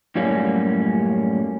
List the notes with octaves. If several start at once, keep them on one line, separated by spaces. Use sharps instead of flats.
F#2 A2 G3 A#3 C#4